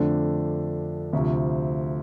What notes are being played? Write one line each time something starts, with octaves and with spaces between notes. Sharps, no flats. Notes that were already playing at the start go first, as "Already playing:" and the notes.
Already playing: F2 D3 A3 D4
D2 C3 F3